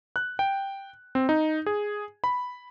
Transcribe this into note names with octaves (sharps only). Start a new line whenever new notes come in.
F#6
G5
C4
D#4
G#4
B5